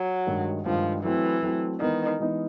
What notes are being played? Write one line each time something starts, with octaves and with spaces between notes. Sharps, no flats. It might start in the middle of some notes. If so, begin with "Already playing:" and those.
Already playing: F#3
G2 D#3 G#3
G2 D#3 F3 G#3
E3 F#3 A3 C4 E4
F#3 A3 C4 E4
D#3 E3 G#3 B3 D#4
E3 G#3 B3 D#4